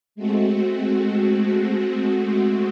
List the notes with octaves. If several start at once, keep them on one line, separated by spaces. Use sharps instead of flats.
G#3 A3 C4 F#4